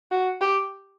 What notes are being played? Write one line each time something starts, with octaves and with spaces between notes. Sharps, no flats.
F#4
G4